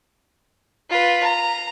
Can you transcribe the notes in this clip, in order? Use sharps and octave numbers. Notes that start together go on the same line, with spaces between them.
F4 B4
A#5